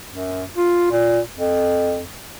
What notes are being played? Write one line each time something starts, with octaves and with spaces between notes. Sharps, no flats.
F#2
F4
A#2
F2